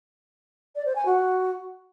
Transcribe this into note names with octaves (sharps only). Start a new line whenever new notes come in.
D5
C5
G#5
F#4